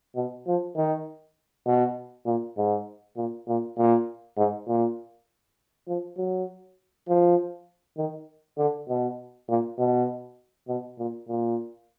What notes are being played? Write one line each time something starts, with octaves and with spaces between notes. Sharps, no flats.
B2
F3
D#3
B2
A#2
G#2
A#2
A#2
A#2
G#2
A#2
F3
F#3
F3
D#3
D3
B2
A#2
B2
B2
A#2
A#2